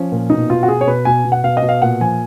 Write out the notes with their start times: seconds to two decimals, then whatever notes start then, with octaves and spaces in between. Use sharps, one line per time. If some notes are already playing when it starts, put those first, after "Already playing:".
Already playing: F3 C#4
0.12 A#2
0.30 B2 D#4
0.50 B2 F4
0.63 F#4
0.68 B2 G#4
0.81 C#5
0.87 B2 B4
1.05 B2 G#5
1.25 B2
1.32 F#5
1.44 B2 F5
1.57 D#5
1.62 B2
1.69 F5
1.82 A#2 F#5
2.01 F3 G#5